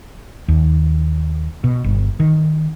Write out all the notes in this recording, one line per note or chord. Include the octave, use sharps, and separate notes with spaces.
D#2
B2
G1
D#3